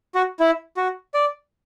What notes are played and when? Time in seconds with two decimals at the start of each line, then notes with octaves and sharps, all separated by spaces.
0.15 F#4
0.40 E4
0.77 F#4
1.14 D5